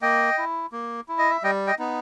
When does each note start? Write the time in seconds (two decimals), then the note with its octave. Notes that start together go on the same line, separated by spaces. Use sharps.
0.02 A#3 D#5 G5
0.38 E4
0.72 A#3
1.09 E4
1.19 D#5
1.31 E5
1.43 G3 D#5 G5
1.67 D#5 G5
1.79 B3 D#4